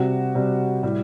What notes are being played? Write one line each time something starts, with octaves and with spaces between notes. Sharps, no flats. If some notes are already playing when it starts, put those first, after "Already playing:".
Already playing: C3 G3 F#4
C3 G3
A2 G3